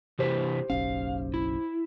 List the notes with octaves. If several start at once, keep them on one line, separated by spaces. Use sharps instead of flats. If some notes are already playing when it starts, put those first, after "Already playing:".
C3 E3 G4 B4 C5
F#1 B1 C#4 F5
E4